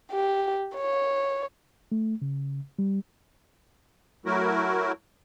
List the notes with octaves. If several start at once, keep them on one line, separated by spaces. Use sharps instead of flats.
G4
C#5
A3
C#3
G3
F#3 A3 E4 F#4 A#4